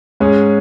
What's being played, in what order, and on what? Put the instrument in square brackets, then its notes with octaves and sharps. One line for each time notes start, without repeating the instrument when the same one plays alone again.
[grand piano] G#2 G#3 C#4 G#4